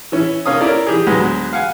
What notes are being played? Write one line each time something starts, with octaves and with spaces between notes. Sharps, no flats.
E3 C#4 E4
A#3 C#4 C#5 F5 D#6
C#4 E4 A#4 D5
E3 G4 G#4
D2 F#3 G#3 B3
F5 F#5 G#5